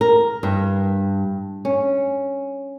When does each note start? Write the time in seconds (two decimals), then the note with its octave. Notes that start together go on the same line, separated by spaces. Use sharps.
0.01 A#4
0.43 G2
1.65 C#4